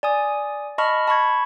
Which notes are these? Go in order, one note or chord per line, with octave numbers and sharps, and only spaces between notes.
D5 G#5 D#6
D#5 A5 B5 C#6 F6
A5 B5 C#6 G#6